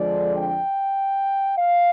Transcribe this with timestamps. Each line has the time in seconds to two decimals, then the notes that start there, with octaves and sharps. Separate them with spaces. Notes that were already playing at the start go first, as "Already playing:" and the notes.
Already playing: F2 D3 F3 G#3 D4 D5
0.36 G5
1.57 F5